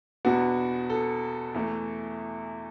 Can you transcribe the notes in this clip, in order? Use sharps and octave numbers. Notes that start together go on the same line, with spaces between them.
E2 B2 B3 D4 F#4
A4
E2 E3 A3